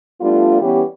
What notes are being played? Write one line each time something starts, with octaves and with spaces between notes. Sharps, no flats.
G3 A3 B3 D4 F4
E3 G3 B3 C#4 G4